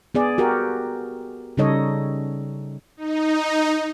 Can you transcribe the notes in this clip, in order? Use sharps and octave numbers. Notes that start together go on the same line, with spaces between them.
B3 G#4 D5
F#4 G4 A#4
C#3 G3 D#4 A4 C#5 D#5
D#4